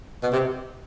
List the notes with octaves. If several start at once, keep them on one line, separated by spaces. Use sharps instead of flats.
B2
C3